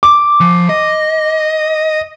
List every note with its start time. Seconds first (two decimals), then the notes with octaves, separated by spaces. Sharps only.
0.03 D6
0.40 F3
0.69 D#5